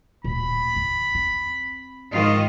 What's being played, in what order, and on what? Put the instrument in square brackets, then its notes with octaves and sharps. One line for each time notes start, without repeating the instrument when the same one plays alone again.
[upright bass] D1 A#2 [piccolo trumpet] B5
[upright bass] A1 E2
C4
[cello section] G#2 D#3 F4 [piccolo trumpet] D#5